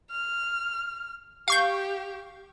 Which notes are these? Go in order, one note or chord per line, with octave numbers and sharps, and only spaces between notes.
F6
G4 F5 C#6 G6